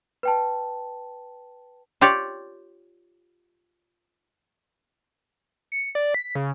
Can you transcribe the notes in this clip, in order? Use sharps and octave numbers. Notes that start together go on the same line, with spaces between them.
B4 G5 A5
F4 G4 C#5 D5
C#7
D5
B6
C#3